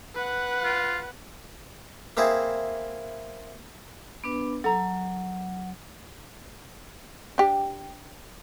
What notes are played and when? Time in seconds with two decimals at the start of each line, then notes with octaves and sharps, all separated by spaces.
0.15 B4 F#5
0.64 F4
2.17 A#3 C4 E4 G#4
4.24 B3 D4 B4
4.64 F#3 A4 A#5
7.38 D4 G4